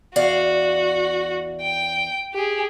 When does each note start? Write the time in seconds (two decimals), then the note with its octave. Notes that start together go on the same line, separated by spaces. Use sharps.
0.16 E2 F#4 D5 F5
1.61 G5
2.34 G4 G#4